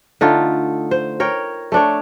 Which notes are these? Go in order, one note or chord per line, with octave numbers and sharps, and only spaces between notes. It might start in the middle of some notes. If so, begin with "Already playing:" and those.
D3 A3 D#4 F4
C5
A#4 C#5 G5
A3 D4 C#5